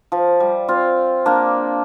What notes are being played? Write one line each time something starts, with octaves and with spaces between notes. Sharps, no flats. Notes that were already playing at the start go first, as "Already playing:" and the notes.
F3
G3
C4 F4
A#3 D4